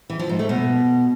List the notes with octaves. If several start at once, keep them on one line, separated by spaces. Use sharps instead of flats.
E3
F3
G#2
A3
B2